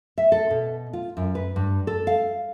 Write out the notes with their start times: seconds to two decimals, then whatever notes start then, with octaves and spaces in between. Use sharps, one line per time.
0.18 E5
0.32 A4
0.51 B2
0.93 F4
1.17 F#2
1.35 B4
1.56 G2
1.87 A4
2.07 F5